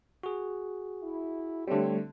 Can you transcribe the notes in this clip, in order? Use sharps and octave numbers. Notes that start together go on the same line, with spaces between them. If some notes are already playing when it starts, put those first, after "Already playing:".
F#4 G#4
E4
D3 G3 A3 C4 G4 C#5